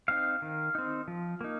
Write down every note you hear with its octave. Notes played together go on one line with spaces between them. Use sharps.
C4 D#4 F5
D#3
C4 D#4
F3
A#3 D#4